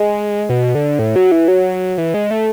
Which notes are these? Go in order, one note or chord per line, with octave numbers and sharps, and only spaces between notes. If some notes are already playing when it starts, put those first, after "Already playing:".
Already playing: G#3
B2
D3
A2
F#3
E3
F#3
E3
G#3
A3